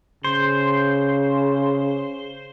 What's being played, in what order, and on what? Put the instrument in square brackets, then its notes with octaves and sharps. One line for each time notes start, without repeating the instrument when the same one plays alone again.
[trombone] C#3 [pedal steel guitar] C5